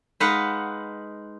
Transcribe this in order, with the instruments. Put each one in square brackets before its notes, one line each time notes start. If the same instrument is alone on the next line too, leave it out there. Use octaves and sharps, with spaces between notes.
[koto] G#3 D#4 B4 F5 F#5